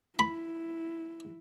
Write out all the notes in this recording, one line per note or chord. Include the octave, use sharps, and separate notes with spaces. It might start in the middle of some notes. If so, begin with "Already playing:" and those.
E4 B5